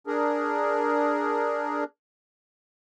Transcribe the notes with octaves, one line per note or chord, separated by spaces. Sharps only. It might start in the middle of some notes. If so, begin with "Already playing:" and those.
D4 G#4 A#4